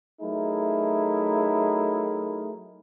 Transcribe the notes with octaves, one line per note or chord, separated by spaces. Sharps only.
F#3 A3 D#4 E4 G#4 A#4